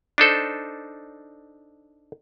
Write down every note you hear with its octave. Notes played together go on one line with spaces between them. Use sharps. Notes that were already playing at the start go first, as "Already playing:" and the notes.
D4 D#4 A4 C5